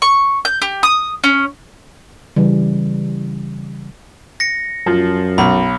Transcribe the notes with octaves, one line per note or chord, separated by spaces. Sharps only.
C#6
G6
G4
D#6
C#4
C#3 E3 G3
A#6 C#7
F#2 F3
B1 B5